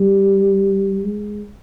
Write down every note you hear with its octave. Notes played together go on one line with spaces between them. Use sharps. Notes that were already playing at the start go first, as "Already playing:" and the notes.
Already playing: G3
G#3